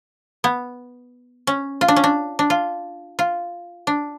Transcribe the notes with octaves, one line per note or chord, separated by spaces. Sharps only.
B3
C#4
F4
D4
C#4
D4
D4
F4
F4
D4